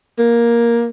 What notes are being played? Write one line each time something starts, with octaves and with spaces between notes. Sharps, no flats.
A#3